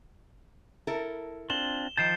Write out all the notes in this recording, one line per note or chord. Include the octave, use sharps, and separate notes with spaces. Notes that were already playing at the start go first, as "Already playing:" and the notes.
E4 A4 A#4
C4 D4 F4 E7 G7
D#3 F3 A5 G6 C7 E7